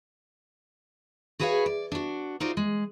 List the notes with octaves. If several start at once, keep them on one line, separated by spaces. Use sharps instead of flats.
F#4 G#4 B4 C#5 E5 F5
D5
D4 F#4
D#4 F4 F#4 C5 D5
G#3